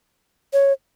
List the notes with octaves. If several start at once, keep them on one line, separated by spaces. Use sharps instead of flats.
C#5